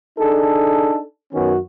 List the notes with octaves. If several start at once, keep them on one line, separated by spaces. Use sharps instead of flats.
D4 D#4 G#4 A4
F#2 D#3 B3 C#4 F#4